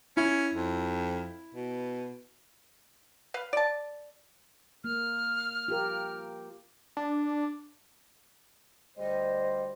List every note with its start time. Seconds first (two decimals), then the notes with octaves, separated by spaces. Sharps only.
0.17 C#4 E4
0.54 F2
1.55 B2
3.34 B4 F5
3.53 D5 A5
4.84 A#3 F6
5.68 F4 G4 A#4
6.97 D4
8.97 D2 G3 C5 D#5